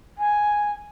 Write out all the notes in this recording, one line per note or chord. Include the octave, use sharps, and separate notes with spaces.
G#5